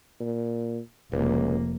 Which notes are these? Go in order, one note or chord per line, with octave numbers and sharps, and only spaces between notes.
A#2
F1 C#2 A#3